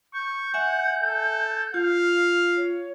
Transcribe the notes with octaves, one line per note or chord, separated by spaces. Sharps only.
C#6 G6
E5 F#5 G#5
A4
F4 F5
C#5